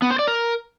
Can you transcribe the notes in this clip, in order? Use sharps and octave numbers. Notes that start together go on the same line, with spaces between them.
B3
C5
D5
A#4